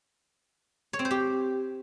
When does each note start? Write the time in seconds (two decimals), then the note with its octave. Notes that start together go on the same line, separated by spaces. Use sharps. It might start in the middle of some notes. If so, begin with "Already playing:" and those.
0.93 C#5
0.99 C4
1.05 C5
1.11 G4